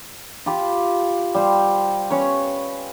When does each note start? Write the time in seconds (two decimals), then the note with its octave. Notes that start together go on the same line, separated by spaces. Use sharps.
0.46 F4 G4 B5
1.34 G3 C5 F5
2.10 C#4 B4 C#5